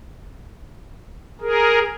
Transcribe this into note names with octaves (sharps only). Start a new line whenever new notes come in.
G#4 A#4